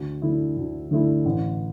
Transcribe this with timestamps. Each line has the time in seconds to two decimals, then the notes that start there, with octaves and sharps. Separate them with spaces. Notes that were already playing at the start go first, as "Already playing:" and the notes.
Already playing: D2
0.22 D3 A3 E4
0.57 D2
0.91 D3 A3 E4
1.25 A1